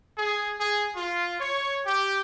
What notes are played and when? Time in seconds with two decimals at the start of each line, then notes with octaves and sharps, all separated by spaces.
0.16 G#4
0.59 G#4
0.94 F4
1.39 C#5
1.85 G4